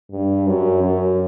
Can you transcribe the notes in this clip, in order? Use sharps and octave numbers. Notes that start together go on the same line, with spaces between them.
G2
F#2
F#2